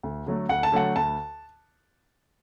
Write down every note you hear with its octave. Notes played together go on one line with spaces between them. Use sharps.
D2
D3 F#3 A3
D2 F#5
A5
D3 F#3 A3 F#5
D2 A5